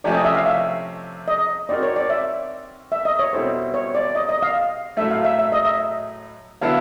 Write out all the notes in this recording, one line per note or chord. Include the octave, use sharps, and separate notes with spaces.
C3 F3 A3 C#4 D5
D#5
E5
F5
E5
D#5
C4 D#4 F#4 A#4 D5
C#5
D5
E5
E5
D#5
C#5
B2 G3 C4 E4 A4 C5
C#5
D5
D#5
D#5
F5
A2 F#3 A3 E5
F5
E5
E5
D#5
E5
D3 F#3 B3 E4 F5